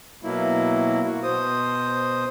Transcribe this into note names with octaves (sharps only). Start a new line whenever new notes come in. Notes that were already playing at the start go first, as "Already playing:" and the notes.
B2 F#3 A#3 E4
F#4
B2 C5 D#6